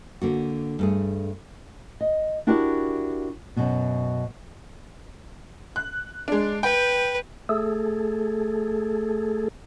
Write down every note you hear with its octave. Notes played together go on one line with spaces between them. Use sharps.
D3 A#3 F#4
G2 A3 G#4
D#5
D4 E4 F#4 G4 A#4 D5
F#2 B2
F#6
G#3 D4
B4 G5
A3 G#4 A4